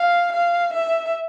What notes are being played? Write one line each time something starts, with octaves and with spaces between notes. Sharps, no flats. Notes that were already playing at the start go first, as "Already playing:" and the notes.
Already playing: F5
F5
E5